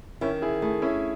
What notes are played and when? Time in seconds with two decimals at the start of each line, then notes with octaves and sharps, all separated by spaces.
0.21 D#3 C#4 E4
0.42 E4 G#4
0.62 A3 E4 G#4
0.82 C#4 E4